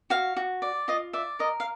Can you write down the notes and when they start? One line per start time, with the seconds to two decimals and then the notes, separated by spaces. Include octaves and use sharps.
0.10 F#4 F5
0.37 F#4
0.62 D5
0.88 F4 D#5
1.13 D5 E5
1.39 A#4 D#5
1.60 F5